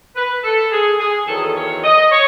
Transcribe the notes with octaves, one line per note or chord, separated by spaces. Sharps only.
B4
A4
G#4
G#4
E2 D#3 F#3 A4
G#4
A4
C#5
D#5
C#5